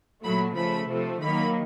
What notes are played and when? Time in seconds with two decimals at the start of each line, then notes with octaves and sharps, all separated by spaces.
0.23 A#2 F#3 A3 B5
0.56 C#3 F3 A3 B5
0.89 C3 F3 A3
1.21 D#3 F#3 A#3 B5